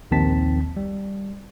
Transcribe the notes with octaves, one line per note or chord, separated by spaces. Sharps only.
A#1 D#2 D#3 C4 A5 B6
G3